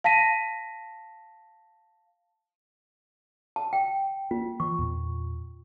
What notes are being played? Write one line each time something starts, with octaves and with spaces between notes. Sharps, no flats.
F5 A5 A#6 B6 D#7
A5
G5
A#3 F4
E3 C#6
E2 A#2